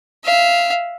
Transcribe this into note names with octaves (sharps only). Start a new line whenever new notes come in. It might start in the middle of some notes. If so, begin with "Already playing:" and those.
E5 F5